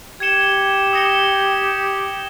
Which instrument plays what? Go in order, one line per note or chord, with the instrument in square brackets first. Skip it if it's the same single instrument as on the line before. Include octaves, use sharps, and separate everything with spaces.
[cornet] G4 [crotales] G#6 C#7 E7 G7
[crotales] D#6 A#6 C#7 E7 G7